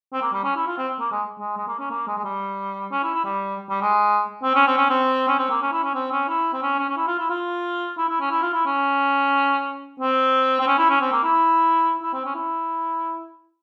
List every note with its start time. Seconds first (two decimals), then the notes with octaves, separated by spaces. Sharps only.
0.13 C4
0.22 A#3
0.33 G3
0.44 C#4
0.56 E4
0.67 F4
0.78 C4
1.00 A#3
1.12 G#3
1.40 G#3
1.57 G#3
1.68 A#3
1.79 C#4
1.91 A#3
2.08 G#3
2.18 G#3
2.25 G3
2.92 C#4
3.04 E4
3.14 E4
3.25 G3
3.70 G3
3.82 G#3
4.43 C4
4.55 C#4
4.67 C4
4.78 C#4
4.90 C4
5.28 C#4
5.39 C4
5.50 A#3
5.62 C#4
5.73 E4
5.84 C#4
5.95 C4
6.12 C#4
6.29 E4
6.54 C4
6.63 C#4
6.79 C#4
6.89 C#4
6.97 E4
7.08 F4
7.19 E4
7.30 F4
7.98 E4
8.09 E4
8.21 C#4
8.31 E4
8.43 F4
8.54 E4
8.66 C#4
10.00 C4
10.60 C4
10.67 C#4
10.78 E4
10.90 C#4
11.01 C4
11.12 A#3
11.23 E4
12.03 E4
12.14 C4
12.25 C#4
12.36 E4